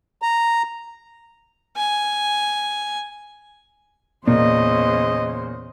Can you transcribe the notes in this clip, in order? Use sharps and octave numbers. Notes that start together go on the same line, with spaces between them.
A#5
G#5
E2 A#2 C#3 C5 D#5